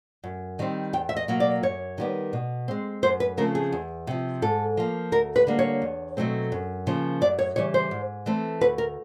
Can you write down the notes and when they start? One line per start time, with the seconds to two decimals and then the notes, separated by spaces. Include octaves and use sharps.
0.24 F#2
0.59 D#3 G3 C4
0.93 E2 G5
1.09 E5
1.17 D#5
1.28 B2 F#3 A#3
1.40 D5
1.63 F#2 C#5
1.98 D#3 G3 B3
2.33 B2
2.68 G#3 C4
3.03 F#2 C5
3.20 B4
3.37 C#3 F3 A3 C4 A#4
3.55 G#4
3.72 E2
4.07 C3 F3
4.42 G#2 A4
4.77 F3 A#3
5.12 D2 A#4
5.36 B4
5.47 D3 G3 A#3
5.59 C#5
5.82 E2
6.17 B2 F#3 A3 C4
6.52 F#2
6.87 C#3 F3 A#3
7.21 F#2 D5
7.39 C#5
7.56 C#3 E3 G3 C#5
7.74 C5
7.91 G#2
8.26 E3 A3 C4
8.61 D2 B4
8.78 A#4